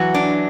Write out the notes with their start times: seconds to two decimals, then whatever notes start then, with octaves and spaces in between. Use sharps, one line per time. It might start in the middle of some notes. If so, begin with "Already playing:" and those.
Already playing: E3 F#3 F#4
0.14 D4